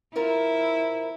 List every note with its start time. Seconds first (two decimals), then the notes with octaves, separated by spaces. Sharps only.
0.16 E4 F4 A#4 C5